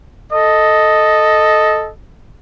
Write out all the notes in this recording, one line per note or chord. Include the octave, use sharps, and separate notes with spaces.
A4 D#5